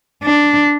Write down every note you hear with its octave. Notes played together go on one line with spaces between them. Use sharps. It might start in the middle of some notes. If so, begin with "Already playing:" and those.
D4